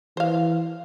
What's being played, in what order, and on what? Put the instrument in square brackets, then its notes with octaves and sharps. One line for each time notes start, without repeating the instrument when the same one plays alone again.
[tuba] E3 [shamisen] C5 F5